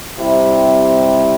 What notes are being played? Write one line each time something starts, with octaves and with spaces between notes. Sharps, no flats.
C3 G3 C4 E4